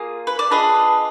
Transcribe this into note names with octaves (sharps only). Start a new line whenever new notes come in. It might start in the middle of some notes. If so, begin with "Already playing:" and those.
Already playing: A#3 F4 G#4
B4
D5
D4 F4 G#4 B4 D#5